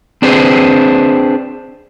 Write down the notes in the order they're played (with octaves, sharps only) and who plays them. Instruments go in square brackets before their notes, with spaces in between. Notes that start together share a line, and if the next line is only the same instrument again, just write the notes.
[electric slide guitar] C4 D4 G#4 B4 C5